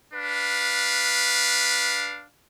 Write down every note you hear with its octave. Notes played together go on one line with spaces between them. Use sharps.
D4 B4 F5